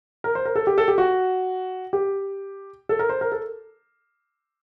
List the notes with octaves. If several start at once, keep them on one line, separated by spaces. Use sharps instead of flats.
A#4
C5
A#4
A4
G4
A4
G4
F#4
G4
A4
A#4
C5
A#4
A4